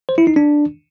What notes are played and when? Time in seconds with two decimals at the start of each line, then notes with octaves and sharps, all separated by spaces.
0.09 C5
0.18 E4
0.27 D#4
0.36 D4